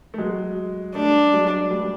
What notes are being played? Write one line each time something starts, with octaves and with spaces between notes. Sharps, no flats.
A3
F#3 G#3
G3 A3 D4
F#3 G#3
G3 A3